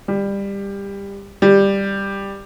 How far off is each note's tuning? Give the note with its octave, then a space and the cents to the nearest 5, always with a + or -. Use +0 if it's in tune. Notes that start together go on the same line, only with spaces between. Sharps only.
G3 +20
G3 +10